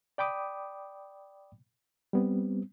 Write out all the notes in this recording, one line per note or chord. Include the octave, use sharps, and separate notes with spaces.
D5 G5 B5 D6 D#6
G3 B3 C4